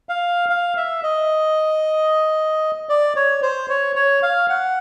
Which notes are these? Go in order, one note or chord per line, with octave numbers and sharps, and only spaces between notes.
F5
F5
E5
D#5
D5
C#5
C5
C#5
C#5
F5
F#5